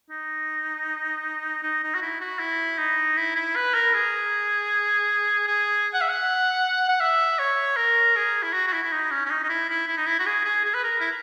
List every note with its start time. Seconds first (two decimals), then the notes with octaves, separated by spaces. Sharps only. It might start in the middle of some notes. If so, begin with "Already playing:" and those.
0.10 D#4
1.63 D#4
1.83 D#4
1.95 F#4
2.02 E4
2.21 F#4
2.39 E4
2.78 D#4
3.17 E4
3.35 E4
3.56 B4
3.74 A#4
3.94 G#4
5.47 G#4
5.94 F#5
6.01 E5
6.09 F#5
6.89 F#5
7.00 E5
7.39 C#5
7.77 A#4
8.16 G#4
8.43 E4
8.53 F#4
8.67 F#4
8.73 E4
8.83 E4
8.92 D#4
9.11 C#4
9.26 C#4
9.30 D#4
9.43 D#4
9.49 E4
9.69 E4
9.87 E4
9.97 D#4
10.06 E4
10.19 F#4
10.26 G#4
10.45 G#4
10.65 G#4
10.74 B4
10.84 A#4
11.00 E4